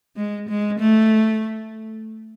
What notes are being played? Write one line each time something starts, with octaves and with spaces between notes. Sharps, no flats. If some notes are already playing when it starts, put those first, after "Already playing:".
G#3
G#3
A3